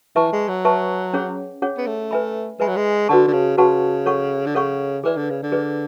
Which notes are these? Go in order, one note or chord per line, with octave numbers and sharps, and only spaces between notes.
E3 B4 E5 A5 C#6
G#3
F#3
B4 E5 A5 C#6
C#4 G#4 C#5 F#5
C#4 G#4 C#5 F#5
B3
A3
B4 E5 G#5 B5
G#3 B4 E5 G#5 B5
F#3
G#3
D3 F#4 B4 F#5 A5 C#6
D3
C#3
C#3 F#4 B4 F#5 A5 C#6
A4 C#5 F#5 C#6
D3
C#3 A4 C#5 F#5 C#6
E3 G#4 B4 D5
D3
C#3
D3
G#4 B4 D5